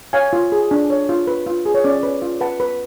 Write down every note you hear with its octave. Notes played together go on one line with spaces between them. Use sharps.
C#5 F5 G#5
F4
G#4
D4
C#5
F4
B4
F4
G#4
C#5
C#4 D5
B4
F4
B4 F#5 A5
B4